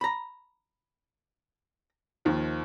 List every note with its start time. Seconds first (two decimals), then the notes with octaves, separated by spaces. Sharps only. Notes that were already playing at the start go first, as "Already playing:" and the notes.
0.01 A#5 B5
2.25 D#2 D#3 F3